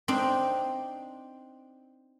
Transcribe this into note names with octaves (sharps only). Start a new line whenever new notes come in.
C4 D4 D#4